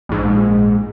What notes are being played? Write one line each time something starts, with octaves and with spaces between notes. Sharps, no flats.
A#1 G#2